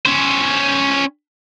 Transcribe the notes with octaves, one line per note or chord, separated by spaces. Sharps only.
C#4 C5